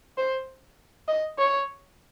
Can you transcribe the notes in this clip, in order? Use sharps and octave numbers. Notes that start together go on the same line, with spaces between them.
C5
D#5
C#5